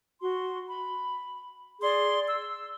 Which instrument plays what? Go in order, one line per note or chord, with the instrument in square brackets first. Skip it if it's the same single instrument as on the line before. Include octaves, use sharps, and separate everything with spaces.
[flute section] F#4 C6
B5
G#4 D5 C6
E6